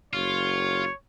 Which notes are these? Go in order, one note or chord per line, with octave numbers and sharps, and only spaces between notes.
F#1 F4 C#5